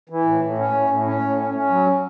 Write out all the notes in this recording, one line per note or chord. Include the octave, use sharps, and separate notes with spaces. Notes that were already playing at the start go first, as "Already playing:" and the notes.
E3
A2
A2
C#4
A2
A2
C#4
A2
C#4
C#4
F#3